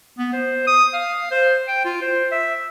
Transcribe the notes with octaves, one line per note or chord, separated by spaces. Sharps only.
B3
C5
D#6
F5
C5
G5
F4
C5
E5